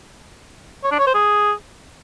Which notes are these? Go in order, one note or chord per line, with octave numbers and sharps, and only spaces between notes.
C#5
D4
C#5
C5
G#4